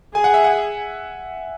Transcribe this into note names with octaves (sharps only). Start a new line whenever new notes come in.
G#4 G#5
F#5
E5
F#5